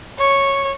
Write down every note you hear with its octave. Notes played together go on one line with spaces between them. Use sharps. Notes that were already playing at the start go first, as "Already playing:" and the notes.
C#5